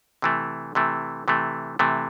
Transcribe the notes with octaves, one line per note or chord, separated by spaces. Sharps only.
C3 E3 A3
C3 E3 A3
C3 E3 A3
C3 E3 A3